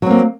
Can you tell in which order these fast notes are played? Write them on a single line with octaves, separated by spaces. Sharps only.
F#3 C4 A#3